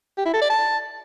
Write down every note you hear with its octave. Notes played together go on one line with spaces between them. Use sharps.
G4
E4
A4
D5
A5